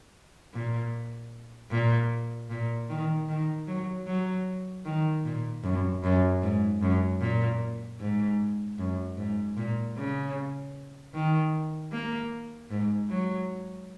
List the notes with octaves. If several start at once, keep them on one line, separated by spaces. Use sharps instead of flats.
A#2
A#2
A#2
D#3
D#3
F#3
F#3
D#3
A#2
F#2
F#2
G#2
F#2
A#2
G#2
F#2
G#2
A#2
C#3
D#3
A#3
G#2
F#3